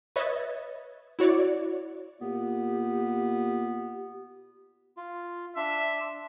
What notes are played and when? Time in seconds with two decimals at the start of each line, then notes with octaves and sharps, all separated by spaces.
0.16 B4 C#5 D#5 E5 G#6 A6
1.19 E4 F#4 C#5 D5
2.21 A#2 B3 G4
4.97 F4
5.57 D4 E5 C6